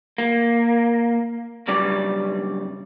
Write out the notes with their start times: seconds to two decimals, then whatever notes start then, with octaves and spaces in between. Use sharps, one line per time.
0.18 A#3
1.68 B1 G2 C#3 G3 D5